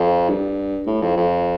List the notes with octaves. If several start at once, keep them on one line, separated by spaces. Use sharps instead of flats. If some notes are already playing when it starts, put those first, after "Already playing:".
Already playing: F2
G2
A2
F2
F2